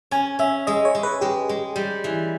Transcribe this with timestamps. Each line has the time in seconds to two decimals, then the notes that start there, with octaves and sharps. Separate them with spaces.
0.11 C#4 G#5
0.39 C#4 E5
0.67 G#3 D#5
0.85 C#5
0.95 G#3
1.03 B4
1.21 G#3 G4
1.49 G#3
1.76 G3
2.04 E3